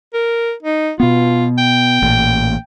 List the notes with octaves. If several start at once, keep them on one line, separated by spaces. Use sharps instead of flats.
A#4
D#4
B2 B3 F4
G5
A1 A#2